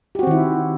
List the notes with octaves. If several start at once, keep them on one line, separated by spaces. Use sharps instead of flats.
D#3 C4 E4 F#4 G4